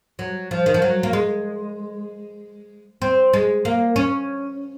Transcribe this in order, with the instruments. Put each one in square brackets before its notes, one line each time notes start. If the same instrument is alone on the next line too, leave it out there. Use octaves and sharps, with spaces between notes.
[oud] F#3
F3
D#3
F3
F#3
A#3
G#3
C4
G#3
A#3
C#4